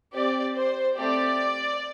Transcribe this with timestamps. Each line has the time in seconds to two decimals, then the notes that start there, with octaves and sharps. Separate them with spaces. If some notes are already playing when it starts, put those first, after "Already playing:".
0.13 C4 G4 D5
0.55 C5
0.96 A3 C4 G4 D5